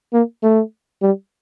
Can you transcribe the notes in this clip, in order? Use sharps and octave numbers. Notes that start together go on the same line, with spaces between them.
A#3
A3
G3